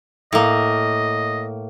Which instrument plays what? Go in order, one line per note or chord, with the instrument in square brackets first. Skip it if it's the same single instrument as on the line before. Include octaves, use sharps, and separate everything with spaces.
[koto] A2 A#3 [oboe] D#5